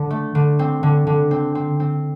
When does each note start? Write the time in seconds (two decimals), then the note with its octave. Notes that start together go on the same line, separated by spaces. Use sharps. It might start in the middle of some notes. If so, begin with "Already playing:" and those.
Already playing: D3
0.10 A3
0.35 D3
0.59 C4
0.83 D3
1.07 D3
1.31 C4
1.55 C4
1.80 C4